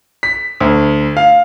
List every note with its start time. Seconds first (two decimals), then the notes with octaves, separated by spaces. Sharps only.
0.23 B6
0.60 D2
1.17 F5